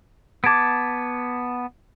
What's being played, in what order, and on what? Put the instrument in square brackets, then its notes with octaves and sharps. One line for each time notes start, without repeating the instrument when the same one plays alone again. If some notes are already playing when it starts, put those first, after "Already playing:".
[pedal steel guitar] B3 A5 [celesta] D6 G#6 D7